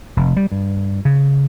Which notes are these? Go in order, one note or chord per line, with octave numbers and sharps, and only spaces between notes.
F1
G3
G2
C#3